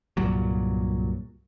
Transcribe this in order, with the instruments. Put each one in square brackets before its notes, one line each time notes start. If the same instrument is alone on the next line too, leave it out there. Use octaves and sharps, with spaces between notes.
[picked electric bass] C2 G2 A#2 F#3